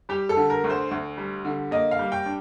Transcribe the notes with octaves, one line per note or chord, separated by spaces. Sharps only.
G3 G4
A4
D3
A#4
D2
C5
D2
G3
D3
A#3 D#5
F5
G3
G5
D4